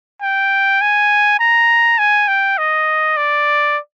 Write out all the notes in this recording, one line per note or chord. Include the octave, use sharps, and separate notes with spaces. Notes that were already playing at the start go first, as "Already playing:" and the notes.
G5
G#5
A#5
G#5
G5
D#5
D5